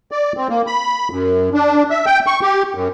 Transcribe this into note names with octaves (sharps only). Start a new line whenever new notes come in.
D5
C4
A#3
B5
F#2
D4
E5
G5
C#6
G4
F#2